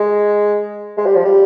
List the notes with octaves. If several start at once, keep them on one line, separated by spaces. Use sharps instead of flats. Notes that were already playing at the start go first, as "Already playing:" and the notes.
Already playing: G#3
G#3
G3
F3
G3